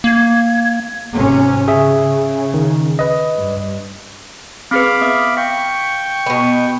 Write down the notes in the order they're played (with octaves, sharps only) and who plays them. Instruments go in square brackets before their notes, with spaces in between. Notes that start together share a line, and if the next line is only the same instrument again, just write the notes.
[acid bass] A#3 [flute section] G#6
[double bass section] G#1 C3 C#4
[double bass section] C#3 [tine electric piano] G#4 E5
[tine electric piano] D#3
B4 D#5
[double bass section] G2
[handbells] C4 G#4 B4 [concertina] F5 B5 D6
[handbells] B3 E5 D#6
[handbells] F5 B6 [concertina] G5 C#6
[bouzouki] B2 B3